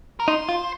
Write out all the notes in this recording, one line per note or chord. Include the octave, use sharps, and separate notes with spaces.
A#4
D#4 C5
F4